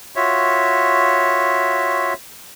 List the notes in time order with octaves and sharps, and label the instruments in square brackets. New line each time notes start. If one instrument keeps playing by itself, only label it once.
[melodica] F4 F#4 C#5 E5